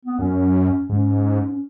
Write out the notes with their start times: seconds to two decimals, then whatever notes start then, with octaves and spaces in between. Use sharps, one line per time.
0.05 B3
0.19 F#2 C#4
0.89 G#2 C#4
1.51 C#4